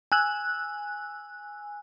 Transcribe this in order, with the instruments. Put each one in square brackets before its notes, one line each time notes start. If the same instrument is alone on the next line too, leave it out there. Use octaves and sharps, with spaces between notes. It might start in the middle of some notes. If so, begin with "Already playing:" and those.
[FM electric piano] G#5 E6 F#6